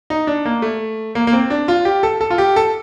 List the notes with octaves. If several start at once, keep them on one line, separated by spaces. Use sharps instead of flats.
D#4
D4
A#3
A3
A#3
A#3
C4
D4
F4
G4
A4
A4
F4
G4
A4